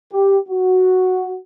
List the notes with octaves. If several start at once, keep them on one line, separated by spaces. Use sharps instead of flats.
G4
F#4